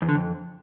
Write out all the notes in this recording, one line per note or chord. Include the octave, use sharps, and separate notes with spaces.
E2
D3
F2